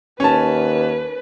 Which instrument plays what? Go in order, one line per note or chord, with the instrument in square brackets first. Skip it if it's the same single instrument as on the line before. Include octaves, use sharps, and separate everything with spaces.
[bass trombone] D#2 [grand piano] C#4 A5 [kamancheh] B4